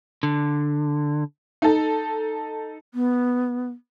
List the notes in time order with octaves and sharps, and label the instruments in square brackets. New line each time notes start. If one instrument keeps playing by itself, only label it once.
[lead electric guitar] D3
[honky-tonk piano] D#4 A4
[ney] B3